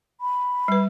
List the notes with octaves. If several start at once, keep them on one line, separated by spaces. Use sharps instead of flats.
B5
G3 B4